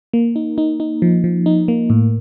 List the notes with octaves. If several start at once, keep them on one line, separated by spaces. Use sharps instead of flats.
A#3
D#4
D#4
D#4
F3
F3
D#4
A#3
A2